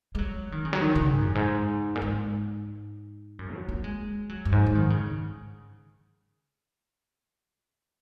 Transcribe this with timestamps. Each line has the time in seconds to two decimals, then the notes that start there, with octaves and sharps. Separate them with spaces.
0.15 G#3
0.19 F#3
0.52 D#3
0.65 C#3
0.73 F#3
0.81 D#3
0.96 C#3
1.11 G#2
1.23 F#2
1.35 G#2
1.95 A#2
2.02 G#2
3.39 F#2
3.54 F#3
3.69 A#3
3.84 G#3
4.29 F#3
4.45 F#2
4.52 G#2
4.66 F#3
4.75 D#3
4.90 C#3